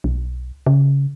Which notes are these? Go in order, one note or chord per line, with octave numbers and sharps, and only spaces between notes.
B1
C#3